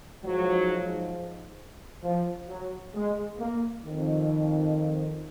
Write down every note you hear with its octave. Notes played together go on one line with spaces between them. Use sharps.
G#2 F3 F#3
F3
F#3
G#3
A#3
F2 D#3